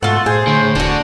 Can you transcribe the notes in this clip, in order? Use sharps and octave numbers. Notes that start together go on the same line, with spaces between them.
G#2 A3 F4 F#4 A4 F#5
A2 G#4 C5
A2 D3
D#1 D3 D4 F#4